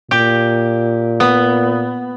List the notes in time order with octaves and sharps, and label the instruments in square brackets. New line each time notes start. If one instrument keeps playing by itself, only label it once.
[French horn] A#2 [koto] G4
[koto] B3